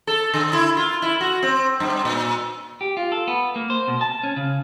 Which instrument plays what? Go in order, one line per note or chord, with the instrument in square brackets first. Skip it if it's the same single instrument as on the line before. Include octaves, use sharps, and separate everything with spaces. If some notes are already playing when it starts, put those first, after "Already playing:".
[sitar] A4
D3
E4
F4
E4
F#4
C4
G2
A#2
[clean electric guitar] G4
F4
A4
B3
A#3
C5
B2
A5
C#4
C#3